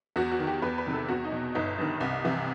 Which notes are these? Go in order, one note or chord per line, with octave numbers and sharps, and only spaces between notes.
E2 F#4
F#4
D#3
G4
E2 B4
B4
C3 D#3
A4
E2 F#4
D#4
B2
G1 D#4
G2 D#3
C2
C3 E3